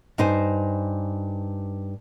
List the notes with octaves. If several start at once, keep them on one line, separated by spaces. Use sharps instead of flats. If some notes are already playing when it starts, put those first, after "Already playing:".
G2 D#4 C5 G#5